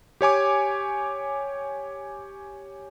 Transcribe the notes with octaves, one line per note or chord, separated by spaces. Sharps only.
G4 C#5 G#5 D6